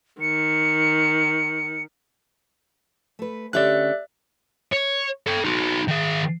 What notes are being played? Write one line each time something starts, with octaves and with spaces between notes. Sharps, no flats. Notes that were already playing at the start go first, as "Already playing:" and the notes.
D#3 C#7
A3 B4
D3 C#4 G4 D5 E5 F#6
C#5
A4 G5
D#4 F#4
D#3 G#4